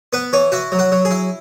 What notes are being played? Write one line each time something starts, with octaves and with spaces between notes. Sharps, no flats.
B3 B4
E3 C#5
E4 F#4
F#3
F#4
F#3
G#4
E4